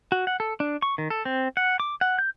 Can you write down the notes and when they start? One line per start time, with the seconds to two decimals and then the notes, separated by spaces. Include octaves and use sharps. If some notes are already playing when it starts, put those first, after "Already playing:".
0.12 F#4
0.27 F#5
0.40 A4
0.60 D4
0.82 C#6
0.98 D#3
1.10 A4
1.25 C4
1.57 F#5
1.80 D6
2.01 F#5
2.19 G6